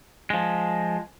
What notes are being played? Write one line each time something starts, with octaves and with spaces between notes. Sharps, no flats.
F3 G#3